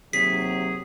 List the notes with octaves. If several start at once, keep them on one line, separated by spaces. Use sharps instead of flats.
D#2 C3 F#3 G#4 B6